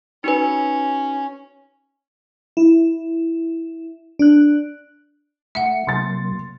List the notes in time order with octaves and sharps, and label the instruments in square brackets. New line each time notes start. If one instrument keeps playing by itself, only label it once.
[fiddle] C#4 [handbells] D#4 F#4 B4
[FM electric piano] E4
D4 F#6
[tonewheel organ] A3 [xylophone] E5 F#5 [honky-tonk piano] C#7
[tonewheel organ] C3 F#3 A#3 [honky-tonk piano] C6 A6